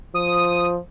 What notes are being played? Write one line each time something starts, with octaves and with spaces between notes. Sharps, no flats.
F3 D#6